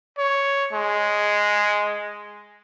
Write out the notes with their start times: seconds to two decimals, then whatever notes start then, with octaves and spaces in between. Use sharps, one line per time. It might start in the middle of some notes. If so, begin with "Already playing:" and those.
0.18 C#5
0.73 G#3